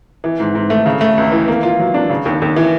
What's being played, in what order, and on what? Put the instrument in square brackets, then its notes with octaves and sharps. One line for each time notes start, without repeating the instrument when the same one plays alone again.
[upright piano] E3
G#2
G#2
A3
C#3
A3
C#2
E3
A#3
F4
F#3
D4
C#3
D#2
D#2
E3